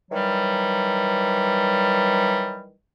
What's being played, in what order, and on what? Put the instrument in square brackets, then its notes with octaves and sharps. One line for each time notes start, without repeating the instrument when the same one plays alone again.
[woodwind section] D#3 E3 F#3 G3